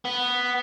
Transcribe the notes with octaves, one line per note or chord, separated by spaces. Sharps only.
B3